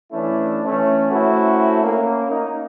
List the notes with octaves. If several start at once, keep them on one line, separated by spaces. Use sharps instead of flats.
E3 A3 C#4 D4 E4
E3 A3 C#4
A3 C4 C#4 E4 F#4
A#3 C#4
D#4